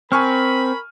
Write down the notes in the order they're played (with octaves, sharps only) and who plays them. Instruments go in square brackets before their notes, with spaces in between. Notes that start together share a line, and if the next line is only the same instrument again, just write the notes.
[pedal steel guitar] C4 [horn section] A#4 B5 [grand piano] G#5 C#6 F6